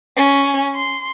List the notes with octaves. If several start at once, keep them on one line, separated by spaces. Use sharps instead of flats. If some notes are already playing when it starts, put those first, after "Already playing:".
C#4
C6